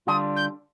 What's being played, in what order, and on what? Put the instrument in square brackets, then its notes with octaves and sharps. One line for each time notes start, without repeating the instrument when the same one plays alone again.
[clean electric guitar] D3 G3 D4 F4 [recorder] D#6
[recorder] G6